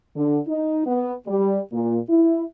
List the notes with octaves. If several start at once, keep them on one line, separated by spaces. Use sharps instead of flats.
D3
D#4
B3
G3
A#2
E4